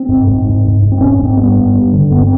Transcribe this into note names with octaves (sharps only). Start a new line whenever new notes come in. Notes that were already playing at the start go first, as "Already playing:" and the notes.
Already playing: C4
G#2
G#2
G#2
G#2
G#2
C4
G#2 C#4
G#2 C4
G2 B3
G2
G2
D3
G2 B3
C4